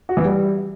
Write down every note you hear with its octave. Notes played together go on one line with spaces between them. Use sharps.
F#4
E3
G3